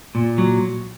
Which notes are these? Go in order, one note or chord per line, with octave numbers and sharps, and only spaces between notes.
A#2
F#3